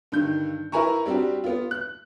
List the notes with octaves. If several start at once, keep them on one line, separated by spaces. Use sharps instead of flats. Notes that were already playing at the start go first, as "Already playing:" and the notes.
G2 D3 D#3 G6
E4 A#4 B4 G#5 A#5 C#6
G3 C4 D4 F#4 G4
B3 F4
F#6